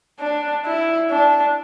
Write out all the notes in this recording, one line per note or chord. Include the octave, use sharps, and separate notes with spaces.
D4
E4
D4